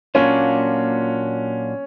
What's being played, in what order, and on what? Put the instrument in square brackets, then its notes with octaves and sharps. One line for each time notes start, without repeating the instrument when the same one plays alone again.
[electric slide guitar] A#2 F#3 A#3 D4 F4 [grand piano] C#4